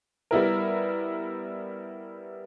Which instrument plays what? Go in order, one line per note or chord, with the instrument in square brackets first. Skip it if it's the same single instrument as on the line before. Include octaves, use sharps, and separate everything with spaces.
[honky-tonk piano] G3 B3 E4 A#4